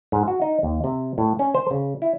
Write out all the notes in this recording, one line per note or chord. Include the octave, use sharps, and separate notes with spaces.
G#2
F#4
D#4
D#2
C3
A2
C#4
C5
C#3
E4